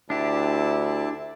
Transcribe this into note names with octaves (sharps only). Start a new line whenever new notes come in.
D2 D4 E4 G4 A5